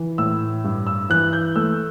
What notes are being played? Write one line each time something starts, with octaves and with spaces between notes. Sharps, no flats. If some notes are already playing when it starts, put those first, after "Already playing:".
Already playing: E3
A2 E6
G2
E6
E3 F#6
G6
A3 E6